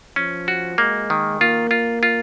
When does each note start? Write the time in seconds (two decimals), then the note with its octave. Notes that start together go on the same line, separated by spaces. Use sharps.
0.16 F3 C#4
0.48 F#4
0.78 G#3 A#3
1.10 D#3
1.40 A#3 F4
1.71 F4
2.03 F4